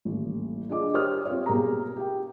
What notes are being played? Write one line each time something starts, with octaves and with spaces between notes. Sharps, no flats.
D#1 A1
D4 F4 G#4 D#5 D6
G4 A#4 C5 C#5 D#6 F6
C4 F4 C#5
B2 A#3 G4 G#4 A#5
G4 G5